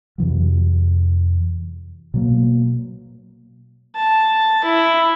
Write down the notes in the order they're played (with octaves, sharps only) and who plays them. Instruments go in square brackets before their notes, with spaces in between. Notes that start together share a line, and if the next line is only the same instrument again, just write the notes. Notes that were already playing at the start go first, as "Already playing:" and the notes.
[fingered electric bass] F2 C3 E3 F#3
B2 F#3 A#3
[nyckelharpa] A5
E4